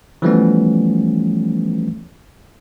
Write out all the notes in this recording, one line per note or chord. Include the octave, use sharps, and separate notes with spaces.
E3 F3 G3 A3 B3 C#4